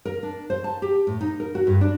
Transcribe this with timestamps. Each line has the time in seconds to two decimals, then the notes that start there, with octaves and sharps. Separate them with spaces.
0.05 A#4
0.23 D4
0.50 C5
0.64 A5
0.82 G4
1.07 A2
1.21 D#4
1.40 A#4
1.55 F#4
1.67 G2
1.81 D4